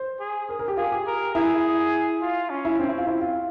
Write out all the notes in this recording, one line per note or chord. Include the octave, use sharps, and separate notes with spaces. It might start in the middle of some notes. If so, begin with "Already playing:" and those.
Already playing: C5
G#4
A#4
A#4
G4
F4 G#4
G4
A#4
E4 G#4
F4
C#4
E4
C4 C#4
E4
F4
C4 E4
F4